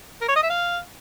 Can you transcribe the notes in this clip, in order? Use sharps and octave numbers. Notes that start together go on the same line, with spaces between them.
A#4
C#5
D#5
E5
F5